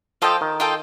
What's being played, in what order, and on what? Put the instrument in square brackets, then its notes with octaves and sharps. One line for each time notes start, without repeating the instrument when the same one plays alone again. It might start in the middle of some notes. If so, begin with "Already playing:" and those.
[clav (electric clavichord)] F3 [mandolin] F4 A4 D#5 G5
[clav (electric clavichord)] D#3
[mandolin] F4 A4 D#5 G5